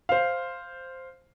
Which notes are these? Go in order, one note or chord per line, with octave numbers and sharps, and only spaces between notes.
C5 F5